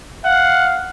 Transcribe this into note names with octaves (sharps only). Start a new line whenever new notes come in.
F5 F#5